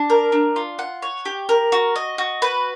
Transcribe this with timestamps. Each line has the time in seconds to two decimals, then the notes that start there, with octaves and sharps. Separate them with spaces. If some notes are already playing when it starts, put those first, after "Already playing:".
Already playing: D4
0.10 A#4
0.32 D4
0.56 F4
0.79 F#5
1.02 C#5
1.25 G4
1.49 A#4
1.72 F#4
1.96 D#5
2.18 F#4
2.42 B4